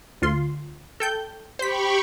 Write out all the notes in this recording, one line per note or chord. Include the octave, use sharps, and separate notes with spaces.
D2 F4 C6
A4 G5 G6
G4 C5 B5 C#6 B6